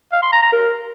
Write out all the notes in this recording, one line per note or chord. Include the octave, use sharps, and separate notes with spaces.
F5
C6
A#5
A#5
A#4